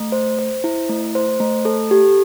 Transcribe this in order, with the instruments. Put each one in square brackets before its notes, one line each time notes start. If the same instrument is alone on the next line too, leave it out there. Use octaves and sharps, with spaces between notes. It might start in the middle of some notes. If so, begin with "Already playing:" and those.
Already playing: [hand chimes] A3
C5
C5
E4
A3
C5
A3
A4
G4